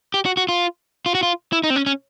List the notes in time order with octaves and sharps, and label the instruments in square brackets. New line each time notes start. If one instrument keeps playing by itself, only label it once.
[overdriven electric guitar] G4
F#4
F#4
F4
F4
F#4
F4
E4
D#4
C4
C#4
C#4